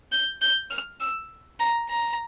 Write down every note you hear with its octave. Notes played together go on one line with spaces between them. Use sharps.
G6
G6
F6
E6
A#5
A#5